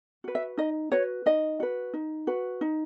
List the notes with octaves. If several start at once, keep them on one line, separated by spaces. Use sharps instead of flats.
F#4 B4
E5
D#4 D#5
F#4 B4 C#5
D#4 D#5
F#4 B4
D#4
F#4 B4
D#4